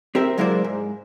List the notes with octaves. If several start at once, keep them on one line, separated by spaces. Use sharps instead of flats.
C4 G4 A#4 E5
F#3 G#3 A#3 E4 C5 D5
G#2